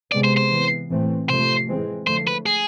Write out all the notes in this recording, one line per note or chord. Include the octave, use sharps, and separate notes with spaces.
C3 G#3 B3 D5
C5
C5
E3 B3
A2 E3 A3 C4
C3 F3 A3 C5
E3 G#3 C4
D3 F3 A3 C5
B4
G#4